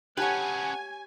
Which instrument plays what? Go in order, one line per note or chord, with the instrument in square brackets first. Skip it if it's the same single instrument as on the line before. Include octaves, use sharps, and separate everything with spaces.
[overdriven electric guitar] C#4 B4 [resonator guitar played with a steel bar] G4 C#5 [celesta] F#5 A5 F#6 [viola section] G#5